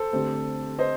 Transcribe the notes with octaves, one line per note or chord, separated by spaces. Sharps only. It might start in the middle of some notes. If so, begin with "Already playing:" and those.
Already playing: A4 C5
D3 A3 C4 G4
C5 D#5